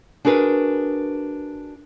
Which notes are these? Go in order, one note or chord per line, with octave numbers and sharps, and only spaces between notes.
D4 F#4 G#4 A#4 B4